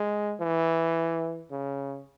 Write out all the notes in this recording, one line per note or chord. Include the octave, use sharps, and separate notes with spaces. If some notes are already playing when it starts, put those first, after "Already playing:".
Already playing: G#3
E3
C#3